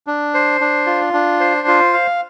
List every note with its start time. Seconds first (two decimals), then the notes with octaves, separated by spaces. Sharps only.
0.07 D4
0.34 C5
0.61 D4
0.87 F4
1.14 D4
1.40 C5
1.68 F4
1.93 F5